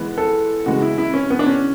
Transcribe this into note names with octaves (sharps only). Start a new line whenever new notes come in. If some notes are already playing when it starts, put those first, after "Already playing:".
Already playing: E3 G#3 B3
A4
C#3 E3 G#3 B3 F#4
E4
E4
C#4
B3
D4
C#4